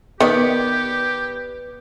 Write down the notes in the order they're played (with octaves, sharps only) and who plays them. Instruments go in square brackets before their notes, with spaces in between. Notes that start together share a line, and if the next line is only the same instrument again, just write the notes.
[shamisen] D#3 [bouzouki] B3 D5 [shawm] G4